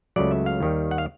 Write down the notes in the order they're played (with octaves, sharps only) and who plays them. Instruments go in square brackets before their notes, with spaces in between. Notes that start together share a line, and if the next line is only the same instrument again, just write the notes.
[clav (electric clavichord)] C#2 C#3 F#3 A3 D5
E5
F5
D#2 D#3 G3
F#5
F5